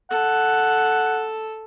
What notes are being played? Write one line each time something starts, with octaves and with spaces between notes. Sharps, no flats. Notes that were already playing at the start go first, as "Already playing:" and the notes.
A4 F#5